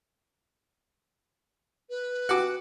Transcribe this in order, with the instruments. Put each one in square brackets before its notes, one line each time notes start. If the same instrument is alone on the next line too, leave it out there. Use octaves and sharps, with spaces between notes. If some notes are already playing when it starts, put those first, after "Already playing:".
[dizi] B4
[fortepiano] F#4 D6